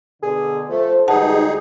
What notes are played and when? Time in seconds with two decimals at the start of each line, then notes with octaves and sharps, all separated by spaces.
0.23 B2 D3 G#4
0.69 F3 A3 A4 C5
1.08 D2 G#2 E3 G3 D#4 G#4 F#5 A5